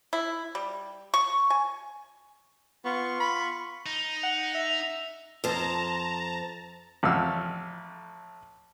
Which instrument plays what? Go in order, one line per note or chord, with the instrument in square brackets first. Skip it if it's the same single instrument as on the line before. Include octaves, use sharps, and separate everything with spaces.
[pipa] E4
G3
C#6
G#5
[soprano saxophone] B3 [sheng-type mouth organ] F4 C#6
[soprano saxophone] B5
[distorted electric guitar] D#4
[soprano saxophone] F#5
E5
[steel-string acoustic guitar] F2 C5 [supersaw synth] A5 A#5
[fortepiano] A1 F2 F#5 E6 F6